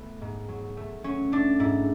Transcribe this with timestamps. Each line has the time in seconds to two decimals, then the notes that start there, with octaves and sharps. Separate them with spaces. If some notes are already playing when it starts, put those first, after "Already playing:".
Already playing: A3 B3
0.21 G#2
0.48 F#3
0.77 A3
1.04 F#3 C#4
1.32 A3 D4
1.60 G#2 E4